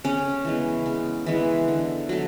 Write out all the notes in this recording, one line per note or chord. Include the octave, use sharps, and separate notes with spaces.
C#3 C#4
E3 G#3 B3
C#3
E3 G#3 B3
D3
F#3 A3